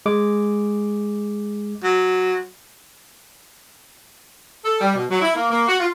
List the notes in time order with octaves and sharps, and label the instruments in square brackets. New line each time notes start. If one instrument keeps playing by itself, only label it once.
[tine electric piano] G#3 D6
[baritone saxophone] F#3
[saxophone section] A4
G3
B2
F#3
E4
A#3
A#3
F#4
F4